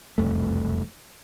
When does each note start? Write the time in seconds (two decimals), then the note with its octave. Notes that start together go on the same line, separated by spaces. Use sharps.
0.18 E1 C2 F2 A3